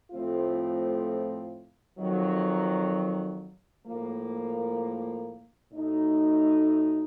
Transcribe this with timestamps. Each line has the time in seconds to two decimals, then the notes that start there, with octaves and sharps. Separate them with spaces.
0.11 A2 F3 A3 C4 F4
1.98 F2 D#3 F#3
3.86 A2 F3 A#3
5.72 A2 A3 D#4 F#4